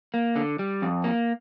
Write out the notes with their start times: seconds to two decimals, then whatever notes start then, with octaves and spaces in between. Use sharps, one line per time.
0.14 A#3
0.36 D3
0.59 G3
0.82 F2
1.04 A#3